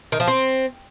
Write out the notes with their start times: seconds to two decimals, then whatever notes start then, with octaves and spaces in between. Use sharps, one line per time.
0.12 D#3
0.20 F3
0.27 C4